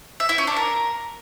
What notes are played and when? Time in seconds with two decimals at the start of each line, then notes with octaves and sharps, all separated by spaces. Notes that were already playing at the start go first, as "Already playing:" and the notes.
0.20 E5
0.29 E4
0.38 C#4
0.47 D4
0.56 A#4